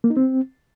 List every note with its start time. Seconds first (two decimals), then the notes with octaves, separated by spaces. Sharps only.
0.04 A#3
0.10 D#4
0.17 C4